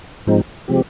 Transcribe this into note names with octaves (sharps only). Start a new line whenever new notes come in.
G#2 F3 G#3 C4 D#4
C3 F3 G#3 C4 G4